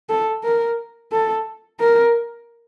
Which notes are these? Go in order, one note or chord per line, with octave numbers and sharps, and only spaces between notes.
A4
A#4
A4
A#4